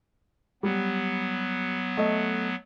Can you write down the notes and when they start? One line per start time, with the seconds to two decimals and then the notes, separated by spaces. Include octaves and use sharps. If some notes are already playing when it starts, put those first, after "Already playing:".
0.63 F#3 G3 B3
1.97 A3 D#5